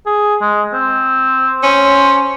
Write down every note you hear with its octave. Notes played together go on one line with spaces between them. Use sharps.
G#4
G#3
C4
C#4 C5